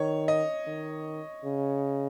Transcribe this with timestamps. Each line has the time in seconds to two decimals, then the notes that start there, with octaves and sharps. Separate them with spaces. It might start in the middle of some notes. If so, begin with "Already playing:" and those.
Already playing: D#3 C#5
0.28 D#5
0.67 D#3
1.44 C#3